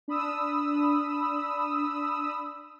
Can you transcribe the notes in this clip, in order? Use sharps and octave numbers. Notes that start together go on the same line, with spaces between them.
D4 B5 D#6 E6